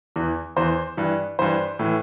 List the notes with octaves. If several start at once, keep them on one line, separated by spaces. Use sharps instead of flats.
E2 E3
E2 E3 C5
G2 E3
G2 E3 C5
A2 E3